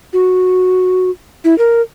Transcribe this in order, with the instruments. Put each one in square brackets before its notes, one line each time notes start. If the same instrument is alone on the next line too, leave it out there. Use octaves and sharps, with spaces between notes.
[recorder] F#4
E4
A#4